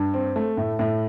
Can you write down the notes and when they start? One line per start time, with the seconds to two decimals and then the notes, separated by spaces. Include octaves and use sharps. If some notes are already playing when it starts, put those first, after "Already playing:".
Already playing: G2
0.14 C4
0.36 A3
0.57 A2
0.79 A2